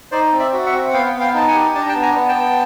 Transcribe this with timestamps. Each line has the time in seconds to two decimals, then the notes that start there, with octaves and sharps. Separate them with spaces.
0.12 D#4 C5 D5
0.32 C4
0.39 D5 E5
0.53 F#4
0.66 E5 F#5
0.73 C4
0.88 F#5
0.93 B3 F5 G5
1.13 B3
1.20 F5 G5
1.34 D#4 A5
1.48 F#5 G#5
1.54 G4
1.75 D4 A5
1.82 A#5
1.89 G5 A5
1.95 B3
2.02 G#5 A#5
2.15 B3
2.28 G5 A5
2.36 B3